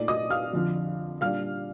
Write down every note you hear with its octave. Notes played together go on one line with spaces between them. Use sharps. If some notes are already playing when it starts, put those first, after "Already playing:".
Already playing: A#2 A3 D#4 D5
D#5 D#6
F5 F6
F2 D3 F3
A#2 G3 D4 F5 F6